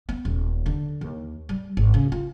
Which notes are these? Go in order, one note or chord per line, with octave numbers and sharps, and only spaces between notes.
B3
D#1
D3
D#2
G3
G#1
C#3
F4